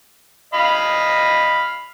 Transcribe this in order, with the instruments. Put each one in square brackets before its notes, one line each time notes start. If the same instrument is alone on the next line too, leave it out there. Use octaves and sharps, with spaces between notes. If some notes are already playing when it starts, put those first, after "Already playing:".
[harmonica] D#5 F5 B5